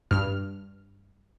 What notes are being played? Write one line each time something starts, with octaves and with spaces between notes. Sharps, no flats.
G2 F6